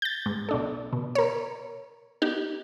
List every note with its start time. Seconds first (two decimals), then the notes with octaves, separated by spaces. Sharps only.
0.02 G6 A6
0.26 G#2
0.49 B1 D4 A4
0.93 B2
1.15 A#4 C#5
2.22 B3 D#4 G4